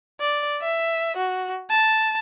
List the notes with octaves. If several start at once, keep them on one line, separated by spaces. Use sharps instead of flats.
D5
E5
F#4
A5